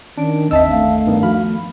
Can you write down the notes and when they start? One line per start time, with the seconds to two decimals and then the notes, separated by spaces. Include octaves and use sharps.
0.17 D#3 C#4 D4 D7
0.51 G1 D#2 C4 D4 D#5 E5 A5 E6
0.70 A3 F5
1.07 G2 D#3 B3 D#4
1.23 F3 F#4 B5 F6